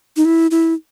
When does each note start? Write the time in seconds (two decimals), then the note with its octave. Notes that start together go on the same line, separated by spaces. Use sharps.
0.16 D#4
0.25 E4
0.51 E4